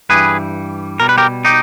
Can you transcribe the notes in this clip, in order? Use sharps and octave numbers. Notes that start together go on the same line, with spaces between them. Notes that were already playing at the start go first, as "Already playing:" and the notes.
G2 E3 G3 G#4 B4
B2 G3 A#4
B4
G4 A#4
D#4 G4